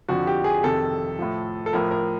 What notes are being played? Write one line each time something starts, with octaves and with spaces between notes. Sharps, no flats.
F2 D3 F3 F#4
G4
G#4
F2 C3 D#3 A4
A2 F3
A4
A2 F3 A#4
A#4